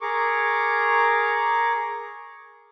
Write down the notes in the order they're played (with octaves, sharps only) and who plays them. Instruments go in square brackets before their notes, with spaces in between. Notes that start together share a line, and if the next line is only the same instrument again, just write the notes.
[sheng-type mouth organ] G#4 A#4 C#6 D6